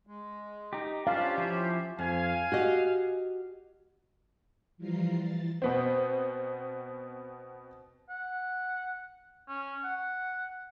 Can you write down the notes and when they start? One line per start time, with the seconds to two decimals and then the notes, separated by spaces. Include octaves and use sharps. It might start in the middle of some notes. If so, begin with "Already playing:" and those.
0.07 G#3
0.73 D#4 G4
1.07 C#4 D4 F4 G4 C5 F5
1.38 F3 E4 C5
1.99 F2 F5 G#5
2.52 F#4 G4 D#5
4.77 E3 F3 G3 F4 A#5 C7
5.18 E3 A6
5.62 B2 B3 C4
8.10 F#5
9.49 C#4
9.84 F#5